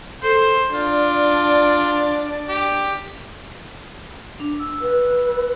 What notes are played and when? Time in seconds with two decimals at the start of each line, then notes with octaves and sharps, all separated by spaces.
0.23 A4 C5
0.74 D4 F4 D5
2.48 G4
4.40 D4
4.59 E6
4.82 B4